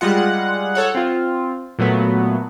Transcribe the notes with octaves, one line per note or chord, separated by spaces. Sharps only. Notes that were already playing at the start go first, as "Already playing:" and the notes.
G3 G#3 F4 F#5
A4 C#5 F#5
C4 F4
A#2 F#3 A3 B3